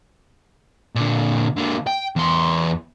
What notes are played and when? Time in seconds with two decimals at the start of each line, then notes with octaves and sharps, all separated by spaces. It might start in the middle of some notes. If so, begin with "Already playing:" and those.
0.95 A#2 D3
1.57 D3 A#3
1.87 G5
2.16 E2 C6